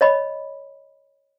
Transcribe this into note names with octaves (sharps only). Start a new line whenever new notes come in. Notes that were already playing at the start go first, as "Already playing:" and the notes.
C#5 D#5 B5